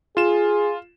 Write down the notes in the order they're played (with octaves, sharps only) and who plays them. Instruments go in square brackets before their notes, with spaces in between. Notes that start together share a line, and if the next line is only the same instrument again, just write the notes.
[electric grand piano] F4 E7 [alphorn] G#4